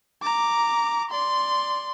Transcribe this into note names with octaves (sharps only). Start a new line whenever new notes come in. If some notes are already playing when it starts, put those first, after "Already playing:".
A#5 D6
D5 C6